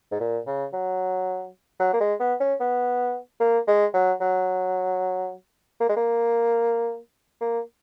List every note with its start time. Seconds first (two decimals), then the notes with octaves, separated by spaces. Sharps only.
0.12 G#2
0.20 A#2
0.47 C#3
0.73 F#3
1.80 F#3
1.93 A#3
2.00 G#3
2.20 B3
2.40 C#4
2.60 B3
3.40 A#3
3.67 G#3
3.94 F#3
4.21 F#3
5.80 A#3
5.89 G#3
5.96 A#3
7.41 A#3